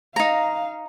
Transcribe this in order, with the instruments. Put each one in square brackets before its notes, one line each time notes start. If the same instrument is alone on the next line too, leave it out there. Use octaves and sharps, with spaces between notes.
[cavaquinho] D#4 A#5 [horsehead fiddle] F5